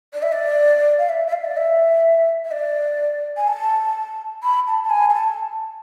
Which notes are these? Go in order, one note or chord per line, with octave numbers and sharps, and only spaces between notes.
D5
E5
D5
F5
E5
E5
F5
D5
E5
E5
D5
G#5
A5
B5
A5
A5
G#5
G#5
A5